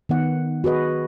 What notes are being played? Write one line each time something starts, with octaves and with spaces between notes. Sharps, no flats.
D#3 B3 F#5
F#4 G#4 B4 D#5